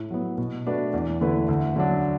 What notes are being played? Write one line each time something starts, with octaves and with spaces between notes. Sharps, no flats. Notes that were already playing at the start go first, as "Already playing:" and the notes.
Already playing: A2
F#3 B3
B2
A3 D4 F#4 B4
E2
D3 A3 E4 B4
D2
D3 F#3 D4